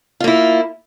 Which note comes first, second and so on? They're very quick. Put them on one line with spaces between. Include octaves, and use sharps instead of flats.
F4 A#3 E4